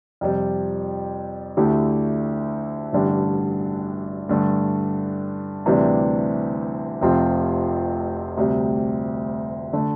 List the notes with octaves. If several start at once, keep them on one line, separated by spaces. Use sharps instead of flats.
F2 C3 G3
D2 D3 A3 E4 G4
A1 G2 D3 G3
G2 D3 A3
D2 C3 E3 G3 D4
F1 F2 C3 F3 C4
D2 C3 G3
D3 A3